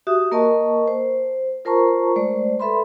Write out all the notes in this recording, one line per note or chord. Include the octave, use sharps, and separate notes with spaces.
F#4 G4 E5 D#6
A#3 A#4 D#5 A5 C#6
C5
F4 A#4 C5 A5 A#5 C#6
G#3 A3 C5 D5
A4 B4 E5 B5 C6